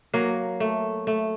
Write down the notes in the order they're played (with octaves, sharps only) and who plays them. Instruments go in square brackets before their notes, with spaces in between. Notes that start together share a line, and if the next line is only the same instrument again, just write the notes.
[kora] F#3 A#3
A3
A3